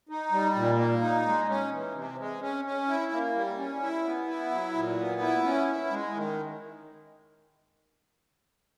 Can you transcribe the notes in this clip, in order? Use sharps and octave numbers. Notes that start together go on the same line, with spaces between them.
D#4
G3
A#2
A#3
D#4
G#3
C#4
E3
C3
G#3
C#4
C#4
E4
A#3
G3
C#4
E4
B3
E4
F#3
A#2
B3
E4
C#4
E4
G#3
D#3